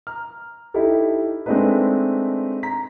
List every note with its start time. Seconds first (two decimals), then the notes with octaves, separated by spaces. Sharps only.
0.07 A#5 F6
0.74 D#4 E4 G4 A4
1.46 G#3 A3 C4 D4 D#4 B4
2.63 A#5 B6